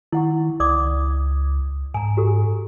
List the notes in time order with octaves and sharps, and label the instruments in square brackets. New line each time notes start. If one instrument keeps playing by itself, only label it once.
[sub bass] D#3 [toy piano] E4 F#5 C#6
[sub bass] C#2 [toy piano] D5 D6 D#6
[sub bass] G#2 [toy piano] G#5 A#5
[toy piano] F#4 G4 A4